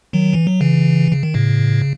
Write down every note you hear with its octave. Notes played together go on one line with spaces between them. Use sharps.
D#3 F#3
E3
F#3
C#3 E3
C#3
D#3
A2 C#3